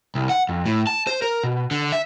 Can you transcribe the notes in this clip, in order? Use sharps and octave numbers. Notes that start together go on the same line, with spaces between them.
C2
F#5
F2
A2
A5
C5
A#4
B2
D3
E5